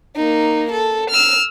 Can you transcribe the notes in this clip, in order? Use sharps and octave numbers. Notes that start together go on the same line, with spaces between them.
A#3 D#4
A4
E6 F6